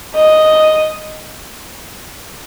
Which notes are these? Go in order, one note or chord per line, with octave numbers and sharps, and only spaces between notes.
D#5